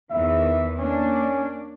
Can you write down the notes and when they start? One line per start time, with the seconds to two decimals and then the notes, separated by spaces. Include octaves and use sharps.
0.10 E2 D#3 E3 E5
0.79 A#3 C#4 D4